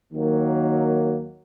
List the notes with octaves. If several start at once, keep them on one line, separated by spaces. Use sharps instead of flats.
D#2 D#3 F#3 A#3